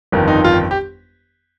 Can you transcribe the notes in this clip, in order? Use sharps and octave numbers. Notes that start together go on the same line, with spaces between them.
G1 F2 D#3
D#4
F4
G4